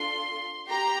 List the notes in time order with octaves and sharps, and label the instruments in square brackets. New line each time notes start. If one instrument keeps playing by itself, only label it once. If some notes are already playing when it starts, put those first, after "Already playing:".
Already playing: [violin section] D4 F4 A4 C6
G4 A#5